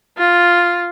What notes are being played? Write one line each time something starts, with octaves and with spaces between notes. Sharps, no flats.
F4